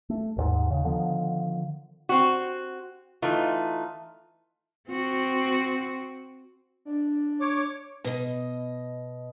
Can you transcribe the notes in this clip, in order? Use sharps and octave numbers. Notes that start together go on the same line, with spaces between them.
A3
A1 D#2 G#2
D#2 C#3
D3 D#3 F3 B3
C4 F#4
E3 A3 D#4 F4
C4 F#4
D4
C#5 D6
B2 D#5